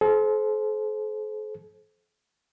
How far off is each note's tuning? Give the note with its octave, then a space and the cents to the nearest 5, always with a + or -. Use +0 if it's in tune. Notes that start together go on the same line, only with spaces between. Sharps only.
A4 -45 C5 +0